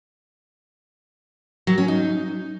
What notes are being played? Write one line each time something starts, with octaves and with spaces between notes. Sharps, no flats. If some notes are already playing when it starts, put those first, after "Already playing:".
F#3
C#4
D#4